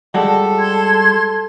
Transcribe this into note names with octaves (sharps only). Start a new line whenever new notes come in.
G3 G#3 F#4 A4
C6 G#6